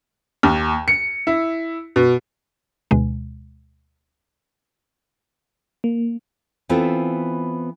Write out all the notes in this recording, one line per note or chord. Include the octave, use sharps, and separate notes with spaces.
D#2
C#7
E4
B2
D2 B2 G#3
A#3
E3 B3 C4 F4 A4